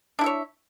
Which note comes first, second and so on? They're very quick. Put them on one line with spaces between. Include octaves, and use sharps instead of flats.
D4 E4 E5 C#5